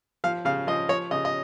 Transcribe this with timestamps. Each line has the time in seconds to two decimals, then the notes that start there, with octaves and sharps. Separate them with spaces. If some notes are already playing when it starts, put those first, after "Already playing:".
0.24 F3 F5
0.45 C#3 F5
0.67 F3 D#5
0.89 F3 C#5
1.11 C#3 D#5
1.25 D#5